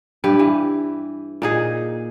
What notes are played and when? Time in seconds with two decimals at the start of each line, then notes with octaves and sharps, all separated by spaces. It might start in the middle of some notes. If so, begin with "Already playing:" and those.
0.24 G2 G4 B4
0.39 E3
1.42 A#2 D#4 G#4